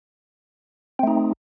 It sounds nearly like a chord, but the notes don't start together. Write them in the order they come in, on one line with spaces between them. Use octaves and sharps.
C4 A3 D#4